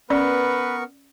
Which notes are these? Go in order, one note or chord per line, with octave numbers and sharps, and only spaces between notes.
B3 C#4 A#4 B4 D5 C#6